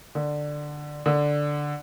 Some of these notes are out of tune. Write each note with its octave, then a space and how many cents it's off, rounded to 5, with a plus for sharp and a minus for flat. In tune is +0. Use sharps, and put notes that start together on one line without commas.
D3 +10
D3 +0